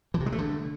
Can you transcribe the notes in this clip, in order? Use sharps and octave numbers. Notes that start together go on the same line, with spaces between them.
E3
C3
G#3
A3
D3